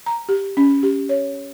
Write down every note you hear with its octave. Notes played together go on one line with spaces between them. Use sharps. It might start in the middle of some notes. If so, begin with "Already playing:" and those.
A#5
G4
C#4
G4
C#5